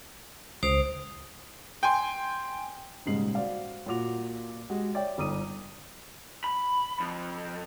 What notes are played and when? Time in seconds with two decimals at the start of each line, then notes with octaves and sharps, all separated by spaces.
0.63 C#2 C5 D#6 D7 F7
1.83 G5 G#5 C6
3.06 D#1 G#2 C#3 G#3 C7 F#7
3.35 F#4 C5 D5 F5
3.86 A#2 F4 F#4 D6 F7
4.69 G#3 F#4 G4
4.94 C#5 D5 E5 G5
5.18 G1 D#4 D6 D#6 D#7
6.44 B5
7.00 F2